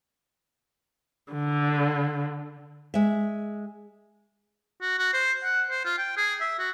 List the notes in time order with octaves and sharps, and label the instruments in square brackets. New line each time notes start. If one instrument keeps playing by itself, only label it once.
[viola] D3
[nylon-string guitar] G#3 E5
[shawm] F#4
F#4
C5
F#5
C5
F4
G5
G#4
E5
F#4